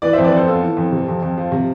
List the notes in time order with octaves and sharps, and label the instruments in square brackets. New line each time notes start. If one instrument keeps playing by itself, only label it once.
[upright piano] E3 B4 D5
F2 C5 E5
B4 D5
F2 A4 C5
B3 F4 A4
E3
F2
C3
F2
F2
F3
C3